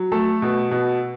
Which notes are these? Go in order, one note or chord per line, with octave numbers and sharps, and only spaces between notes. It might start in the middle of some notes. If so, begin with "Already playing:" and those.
Already playing: F#3
A3 A4
B2
B2